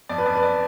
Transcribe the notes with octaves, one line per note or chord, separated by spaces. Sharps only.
F2 D5
B4
F2 D5
B4
D5